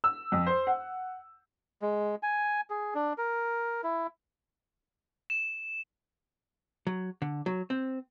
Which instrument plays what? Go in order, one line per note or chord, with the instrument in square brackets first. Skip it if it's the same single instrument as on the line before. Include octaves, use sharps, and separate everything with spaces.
[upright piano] E6
F2
C5
F#5
[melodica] G#3
G#5
G#4
D4
A#4
E4
[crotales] E7
[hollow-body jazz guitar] F#3
D3
F#3
C4